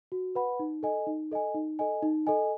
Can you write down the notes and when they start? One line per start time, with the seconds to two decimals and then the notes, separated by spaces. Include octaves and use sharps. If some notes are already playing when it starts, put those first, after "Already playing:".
0.12 F#4
0.35 B4 F#5 B5
0.59 D#4
0.83 A4 D#5 G#5
1.07 D#4
1.31 A4 D#5 G#5
1.55 D#4
1.79 A4 D#5 G#5
2.03 D#4
2.27 A4 D#5 G#5